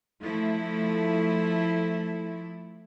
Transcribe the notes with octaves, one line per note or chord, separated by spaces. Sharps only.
F3 A3 E4